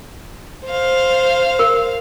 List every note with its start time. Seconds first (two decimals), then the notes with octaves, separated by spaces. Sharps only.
0.65 C5 F5
1.59 A#4